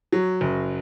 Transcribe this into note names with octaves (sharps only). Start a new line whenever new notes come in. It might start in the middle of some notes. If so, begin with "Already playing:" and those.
F#3
F#1